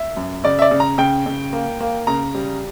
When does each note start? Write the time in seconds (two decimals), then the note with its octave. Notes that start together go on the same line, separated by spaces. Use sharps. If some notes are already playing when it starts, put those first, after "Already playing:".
Already playing: E5
0.17 F#2
0.44 C#3 D5
0.59 E5
0.62 D5
0.71 C#3
0.80 A#5
0.98 C#3 G5
1.26 C#3
1.53 A#3
1.80 A#3
2.07 C#3 A#5
2.35 G3